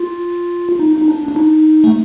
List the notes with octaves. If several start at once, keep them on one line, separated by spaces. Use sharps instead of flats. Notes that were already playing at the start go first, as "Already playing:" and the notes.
Already playing: F4
D#4
D#4
D4
D4
D#4
A3